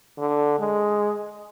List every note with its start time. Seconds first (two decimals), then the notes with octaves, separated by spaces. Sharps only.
0.19 D3
0.59 G#3